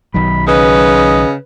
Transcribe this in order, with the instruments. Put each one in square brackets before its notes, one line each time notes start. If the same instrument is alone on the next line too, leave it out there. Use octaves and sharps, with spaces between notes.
[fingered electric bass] B1 D#3 F#3 [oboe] B5
[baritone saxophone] C#3 [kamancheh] B4 [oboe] D#5